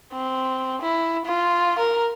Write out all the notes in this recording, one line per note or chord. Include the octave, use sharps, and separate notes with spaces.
C4
E4
F4
A#4